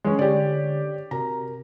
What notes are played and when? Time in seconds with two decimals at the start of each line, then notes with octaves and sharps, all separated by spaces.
0.05 E3 G#3 C#4
0.19 D3 G4 C#5 D5
1.11 C3 F#4 A#4 A#5